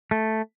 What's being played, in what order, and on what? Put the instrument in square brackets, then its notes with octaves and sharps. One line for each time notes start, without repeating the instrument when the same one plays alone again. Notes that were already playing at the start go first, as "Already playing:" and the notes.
[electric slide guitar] A3